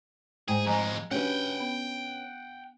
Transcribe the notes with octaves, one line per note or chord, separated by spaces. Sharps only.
G#2 G#4 G5 G#5
F2 G#3 D#5 G#5 A#5
C#4 D4 F#4 G4 B4 F#5 G5
B3